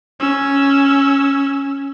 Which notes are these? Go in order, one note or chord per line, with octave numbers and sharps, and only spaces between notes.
C#4 E6